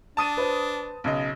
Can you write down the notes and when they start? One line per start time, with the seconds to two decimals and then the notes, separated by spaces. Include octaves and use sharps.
0.17 D4 A5 D#6 D#7
0.37 B4 C5
1.04 B1 C#3 D#5